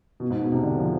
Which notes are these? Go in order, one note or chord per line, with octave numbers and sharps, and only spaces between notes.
B2
G#2
B2
C3
D3
F3